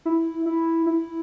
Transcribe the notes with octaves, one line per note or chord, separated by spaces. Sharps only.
E4
E4
E4